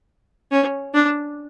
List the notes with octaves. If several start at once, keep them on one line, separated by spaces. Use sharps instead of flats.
C#4
D4